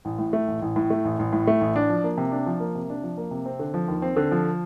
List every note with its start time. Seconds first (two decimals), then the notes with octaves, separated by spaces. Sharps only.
0.05 A1
0.19 A2
0.33 A3
0.48 A1
0.62 A1
0.76 A2
0.90 A3
1.05 A1
1.19 A1
1.33 A2
1.47 A3
1.61 A1
1.76 D4
1.90 F3
2.04 A#3
2.17 C3
2.32 D4
2.46 F3
2.60 A#3
2.75 C3
2.89 D4
3.03 F3
3.17 A#3
3.31 C3
3.46 C4
3.59 D3
3.74 F3
3.88 D#2
4.02 C4
4.16 D3
4.31 F3